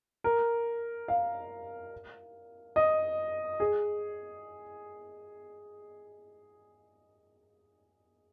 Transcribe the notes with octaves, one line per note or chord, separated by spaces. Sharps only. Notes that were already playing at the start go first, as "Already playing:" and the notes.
A#4
F5
D#5
G#4